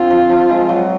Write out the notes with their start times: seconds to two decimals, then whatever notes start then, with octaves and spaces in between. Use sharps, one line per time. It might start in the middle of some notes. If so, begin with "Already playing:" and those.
Already playing: D3 C4 F4
0.10 F3
0.29 F3
0.49 G#3
0.69 F#3